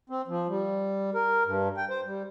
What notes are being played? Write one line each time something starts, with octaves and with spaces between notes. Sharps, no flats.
C4
F3
G3
A#4
G2
G5
C5
G3